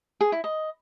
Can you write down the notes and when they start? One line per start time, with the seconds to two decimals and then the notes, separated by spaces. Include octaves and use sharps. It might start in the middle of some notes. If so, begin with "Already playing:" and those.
0.21 G#4
0.32 E4
0.44 D#5